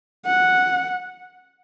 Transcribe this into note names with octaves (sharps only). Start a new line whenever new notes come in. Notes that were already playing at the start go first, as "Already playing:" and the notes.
F#5